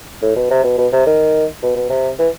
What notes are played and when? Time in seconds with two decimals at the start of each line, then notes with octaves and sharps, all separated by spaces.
0.22 A2
0.36 B2
0.51 C3
0.64 B2
0.78 B2
0.93 C3
1.06 D#3
1.63 B2
1.76 B2
1.90 C3
2.19 E3